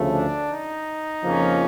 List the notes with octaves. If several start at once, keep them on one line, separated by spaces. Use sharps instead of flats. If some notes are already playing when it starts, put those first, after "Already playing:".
Already playing: D2 C#3 F3 A3
D4
D#4
F2 C#3 F3 A#3 C#4